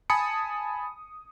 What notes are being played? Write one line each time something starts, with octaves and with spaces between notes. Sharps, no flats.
G#5 A5 B5 D#6 C#7